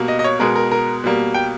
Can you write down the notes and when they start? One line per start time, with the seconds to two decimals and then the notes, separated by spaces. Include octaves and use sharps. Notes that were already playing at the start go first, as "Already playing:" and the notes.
Already playing: B2 G3 A#3
0.08 D#5
0.19 D#5
0.24 C#5
0.39 B2 G#3 B3 A#4
0.55 A#4
0.72 A#4
1.04 B2 G3 A#3
1.34 G5